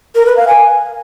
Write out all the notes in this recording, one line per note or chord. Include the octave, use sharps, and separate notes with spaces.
A#4
B4
F5
G#5